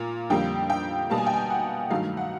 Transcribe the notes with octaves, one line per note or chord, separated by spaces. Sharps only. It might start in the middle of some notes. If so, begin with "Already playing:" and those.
Already playing: A#2 A#3
F2 D3 G3 A#3 G5
G5
B2 G3 A#3 A5
G#5
G5
G#5
F#5
G2 D#3 F#3 A3 F5
F#5